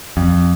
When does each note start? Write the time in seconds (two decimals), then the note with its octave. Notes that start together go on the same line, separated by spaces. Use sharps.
0.17 F2